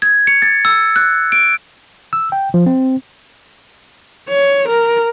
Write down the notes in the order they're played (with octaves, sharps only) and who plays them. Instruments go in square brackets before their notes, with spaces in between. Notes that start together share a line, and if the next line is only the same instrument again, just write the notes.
[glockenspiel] G#6
C#7
A6
E6
F#6
D7
[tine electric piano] E6
G5
F3
C4
[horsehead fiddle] C#5
A#4